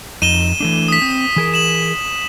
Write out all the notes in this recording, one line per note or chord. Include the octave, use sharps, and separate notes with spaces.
F2 D#4 D#7 E7 G7
E3 A3 D4
D#6 B6
C4
E3 G#4 A#4
E7 F#7